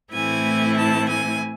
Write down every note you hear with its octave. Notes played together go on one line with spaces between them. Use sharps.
A2 E3 A3 C4 E4 G#5
A5
G#5